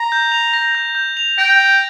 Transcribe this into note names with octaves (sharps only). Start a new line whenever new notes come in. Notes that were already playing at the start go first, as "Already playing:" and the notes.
Already playing: A#5
G6
F7
A#6
G6
G6
F7
G5 A#6
G6